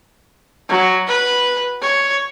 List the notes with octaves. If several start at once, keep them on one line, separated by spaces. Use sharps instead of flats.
F#3
B4
C#5